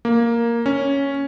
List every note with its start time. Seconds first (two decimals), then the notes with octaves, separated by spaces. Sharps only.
0.05 A#3
0.66 C#4